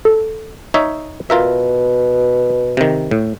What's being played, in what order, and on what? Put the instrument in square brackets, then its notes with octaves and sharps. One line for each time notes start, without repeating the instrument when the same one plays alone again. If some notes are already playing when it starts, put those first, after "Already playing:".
[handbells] A4
[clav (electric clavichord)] D#4 C#5 E5
[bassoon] B2 [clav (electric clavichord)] F4 A#4 E5
[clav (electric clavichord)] C3 D#3
A2